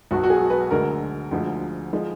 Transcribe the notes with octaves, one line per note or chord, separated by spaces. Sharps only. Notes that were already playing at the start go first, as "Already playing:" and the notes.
B1 B2 F#3 F#4
F#4
G#4
B4
D2 D3 G#3 A#4
D2 D3 F3 G#3
F3 G#3